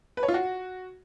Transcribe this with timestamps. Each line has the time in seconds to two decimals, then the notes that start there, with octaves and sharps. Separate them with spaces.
0.17 B4
0.23 C#5
0.28 F4
0.34 F#4